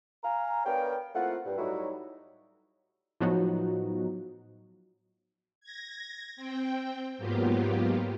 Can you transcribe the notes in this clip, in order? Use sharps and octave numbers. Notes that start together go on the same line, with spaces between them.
F5 G#5 A#5
B3 D4 A#4 C#5 F5 G5
A3 A#3 C4 E4 F4 F#5
G2
A2 F#3 G3 D#4 E4 F#4
A2 F3 F#3 B3 D#4 F#4
G#6 A#6
C4 G5
G#2 F#3 A#3 B3 F4 G4